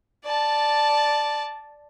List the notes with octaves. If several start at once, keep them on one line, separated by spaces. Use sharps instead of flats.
D5 A5